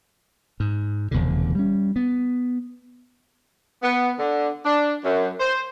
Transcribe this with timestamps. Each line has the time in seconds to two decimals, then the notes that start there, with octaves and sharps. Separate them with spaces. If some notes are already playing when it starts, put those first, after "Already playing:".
0.60 G#2
1.11 F1 E2 B2 D3
1.55 G3 C#4
1.96 B3
3.82 B3
4.18 D3
4.64 D4
5.04 F#2
5.40 C5